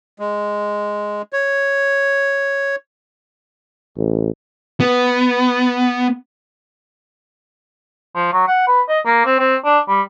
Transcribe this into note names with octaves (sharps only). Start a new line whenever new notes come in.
G#3
C#5
A1
B3
F3
F#3
F#5
B4
D#5
A#3
C4
C4
D4
G3